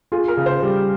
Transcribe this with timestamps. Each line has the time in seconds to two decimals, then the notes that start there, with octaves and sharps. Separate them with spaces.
0.12 F4 G#4
0.28 A#4
0.37 C#3
0.46 C5
0.62 G3